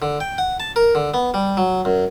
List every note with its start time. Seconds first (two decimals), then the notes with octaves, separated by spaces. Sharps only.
0.02 D3
0.20 G5
0.38 F#5
0.60 A5
0.76 A#4
0.95 D3
1.14 B3
1.34 G3
1.57 F#3
1.85 F#2